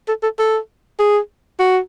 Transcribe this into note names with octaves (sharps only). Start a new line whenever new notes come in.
A4
A4
A4
G#4
F#4